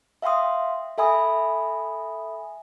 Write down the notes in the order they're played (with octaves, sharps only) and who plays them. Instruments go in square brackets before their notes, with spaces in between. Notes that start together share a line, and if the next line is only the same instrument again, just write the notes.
[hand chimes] E5 F5 G5 C6 D#6
A4 E5 G#5 B5 D#6